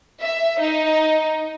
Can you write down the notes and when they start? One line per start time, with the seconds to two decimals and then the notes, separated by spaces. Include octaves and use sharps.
0.21 E5
0.60 D#4